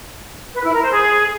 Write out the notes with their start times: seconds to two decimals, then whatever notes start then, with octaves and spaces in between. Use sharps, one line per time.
0.54 B4
0.64 E4
0.73 A#4
0.82 C5
0.91 G#4